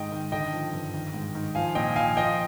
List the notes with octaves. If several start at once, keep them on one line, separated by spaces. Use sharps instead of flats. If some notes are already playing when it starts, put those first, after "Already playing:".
Already playing: G#2 D#3 D#5 G5
D#3
D3 D#5 G5
F3
G2
D#3
G#2
D#3
F3 F5 G#5
A#2 D#5 G5
F3 F5 G#5
F3 D#5 G5